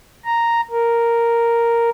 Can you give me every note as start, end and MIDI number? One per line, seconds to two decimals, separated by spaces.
0.25 0.61 82
0.71 1.90 70